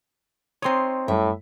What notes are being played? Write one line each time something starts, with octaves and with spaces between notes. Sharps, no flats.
C4 D#4 C#5 C6 D#6
F#2 A2 G3 E5